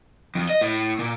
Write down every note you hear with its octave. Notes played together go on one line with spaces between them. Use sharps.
F2
D#5
A2
A#2